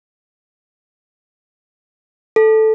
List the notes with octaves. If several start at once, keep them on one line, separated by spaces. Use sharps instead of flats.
A4